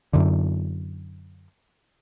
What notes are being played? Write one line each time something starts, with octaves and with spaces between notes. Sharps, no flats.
F#2 D3